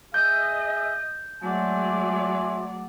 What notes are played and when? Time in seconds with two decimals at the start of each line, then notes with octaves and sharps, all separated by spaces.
0.14 G#4 D#5 E5 G6
1.43 F#3 G#3 A3 E4 D5 F#5 G#5 C6